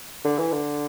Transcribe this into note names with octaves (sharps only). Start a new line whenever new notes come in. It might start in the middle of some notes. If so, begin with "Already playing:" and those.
D3
E3
D3